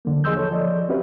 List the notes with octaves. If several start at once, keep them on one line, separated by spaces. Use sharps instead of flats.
E2 D3 F#3 A#3
F3 G#4 D#5 C6 E6 G6
A4 C#5
F3 D5 D#5
C4 C#4 F#4 G4 B4 E5